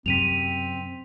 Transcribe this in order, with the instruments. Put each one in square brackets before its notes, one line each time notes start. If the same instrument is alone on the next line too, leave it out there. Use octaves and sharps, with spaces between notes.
[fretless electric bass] F#2 C3 [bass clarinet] C4 [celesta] B6 D#7 F7